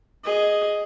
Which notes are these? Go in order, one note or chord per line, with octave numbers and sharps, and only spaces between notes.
G#4 D#5